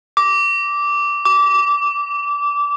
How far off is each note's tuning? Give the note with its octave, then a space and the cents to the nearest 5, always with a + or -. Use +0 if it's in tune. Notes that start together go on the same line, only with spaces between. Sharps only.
D6 -10
D6 -20